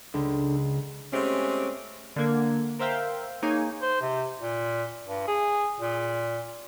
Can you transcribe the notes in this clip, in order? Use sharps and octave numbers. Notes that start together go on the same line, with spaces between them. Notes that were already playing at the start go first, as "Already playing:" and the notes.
C#2 D3
G#3 A3 C4 C#4 G4
D3 A#3 G#6
A#4 C5 E5 F5 G5
A#3 D#4 G#4 C#5 G#5
C5
C3
A#2
G2
G#4
A#2